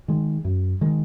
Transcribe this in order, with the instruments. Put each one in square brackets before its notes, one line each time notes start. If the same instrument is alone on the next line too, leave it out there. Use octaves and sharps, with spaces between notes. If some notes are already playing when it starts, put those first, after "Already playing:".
[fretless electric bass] D#3 G#3
F#2
D#3 G#3